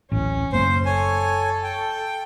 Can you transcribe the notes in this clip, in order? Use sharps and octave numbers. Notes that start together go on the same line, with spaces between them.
D1 A1 C#4
F#1 A#3 C5
A4 C#5 G#5
G5